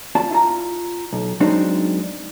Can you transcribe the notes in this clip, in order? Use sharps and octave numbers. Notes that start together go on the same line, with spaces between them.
C4 F4 D5 A5
E4 F4 A#5
B1
F#3 G#3 C4 D4 D#4